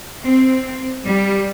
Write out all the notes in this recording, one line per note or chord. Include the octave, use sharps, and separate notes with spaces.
C4
G3